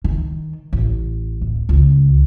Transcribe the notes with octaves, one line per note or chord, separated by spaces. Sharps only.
D#3
A1
D1
C#2